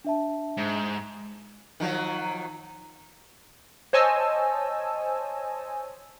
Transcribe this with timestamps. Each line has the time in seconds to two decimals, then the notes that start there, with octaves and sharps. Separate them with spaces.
0.04 D4 E5 A5
0.57 G#2
1.80 D#3 F3 F#3
3.93 C5 C#5 D#5 G#5 A5 E6